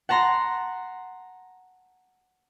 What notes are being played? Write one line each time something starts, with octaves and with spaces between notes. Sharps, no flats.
F#5 A5 A#5 C6 A#6